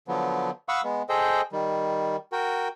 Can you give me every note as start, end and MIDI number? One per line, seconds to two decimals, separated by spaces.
0.08 0.50 50
0.08 0.50 53
0.08 0.50 54
0.08 0.50 59
0.69 0.81 77
0.69 0.81 78
0.69 0.81 83
0.69 0.81 85
0.69 0.81 87
0.69 0.81 88
0.84 1.02 56
0.84 1.02 59
1.09 1.41 68
1.09 1.41 69
1.09 1.41 72
1.09 1.41 75
1.09 1.41 79
1.52 2.16 51
1.52 2.16 55
2.32 2.68 66
2.32 2.68 70
2.32 2.68 79